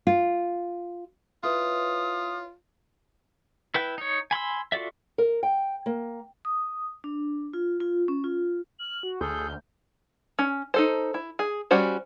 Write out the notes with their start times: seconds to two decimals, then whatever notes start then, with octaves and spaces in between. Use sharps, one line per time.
0.07 F4
1.43 E4 F4 B4 C#5 D#6
3.74 E4 B4 G5
3.98 D#4 C#5
4.31 G#5 B5 C6 E6
4.72 F4 F#4 A4 D5 E5
5.18 A#4
5.43 G5
5.86 A#3
6.45 D#6
7.04 D4
7.53 F4
7.80 F4
8.08 C#4
8.24 F4
8.79 F6 F#7
9.03 F#4
9.21 D2 G#4 A4 F6 G6
10.39 C#4
10.74 D#4 A4 C5
11.14 E4
11.39 G#4
11.71 G3 C#4 F#4 C5